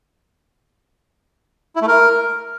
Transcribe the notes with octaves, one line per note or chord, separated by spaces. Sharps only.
E4
A3
A#4